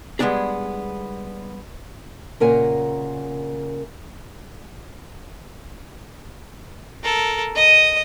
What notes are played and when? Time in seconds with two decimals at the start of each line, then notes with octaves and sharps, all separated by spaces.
0.19 G3 G#3 B3 C#4 D4 G#4
2.40 A#2 C#3 A#4 F#5 G#5
7.03 A4 A#4
7.55 D#5 D#6